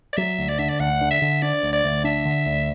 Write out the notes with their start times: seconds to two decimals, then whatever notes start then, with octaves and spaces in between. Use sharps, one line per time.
0.13 D5
0.17 F#3 E5
0.39 D2
0.49 D5
0.59 D3 E5
0.69 D5
0.80 D2 F#5
1.01 D3
1.11 E5
1.22 D3
1.42 D4 D5
1.63 D2
1.73 D5
1.84 D2
2.04 D4 E5
2.25 D3
2.46 D2